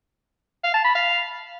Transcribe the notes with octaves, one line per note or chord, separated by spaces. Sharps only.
F5
A5
B5
F5